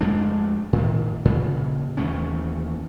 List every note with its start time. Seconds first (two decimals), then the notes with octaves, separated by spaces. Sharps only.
0.01 F2 G#3 A3 D4
0.73 A2 D#3
1.25 A#2 C#3
1.97 D#2 E3 A3 C#4